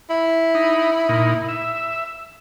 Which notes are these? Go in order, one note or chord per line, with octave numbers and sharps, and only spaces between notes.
E4
D#4
A#2 D#4
E5